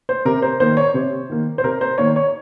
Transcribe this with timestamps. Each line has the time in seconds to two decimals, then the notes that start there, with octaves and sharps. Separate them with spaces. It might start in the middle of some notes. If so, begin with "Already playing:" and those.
0.09 C5
0.25 C3 A#4
0.42 C5
0.60 D#3 A#3 C5
0.77 C#5
0.94 C3 C5
1.30 D#3 A#3
1.58 C5
1.64 C3 A#4
1.81 C5
1.98 D#3 A#3 C#5
2.16 C#5